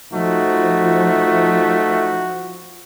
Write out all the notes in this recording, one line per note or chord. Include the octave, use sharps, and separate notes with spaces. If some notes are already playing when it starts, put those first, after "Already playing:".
F3 A3 D#4 F#4